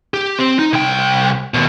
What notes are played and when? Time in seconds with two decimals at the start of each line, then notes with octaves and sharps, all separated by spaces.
0.14 G4
0.39 C4
0.59 D#4
0.73 C2 G5
1.54 D#2 B2